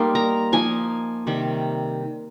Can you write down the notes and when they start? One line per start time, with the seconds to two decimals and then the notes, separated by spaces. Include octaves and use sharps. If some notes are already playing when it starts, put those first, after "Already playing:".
Already playing: G3 A#3 D#4 C6
0.15 A#5
0.52 F3 A#3 D#4 G#5
1.27 C3 D#3 G3